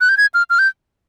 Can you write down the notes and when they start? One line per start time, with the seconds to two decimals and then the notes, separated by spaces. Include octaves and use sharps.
0.01 F#6
0.09 G6
0.18 G#6
0.34 F6
0.50 F6
0.59 G6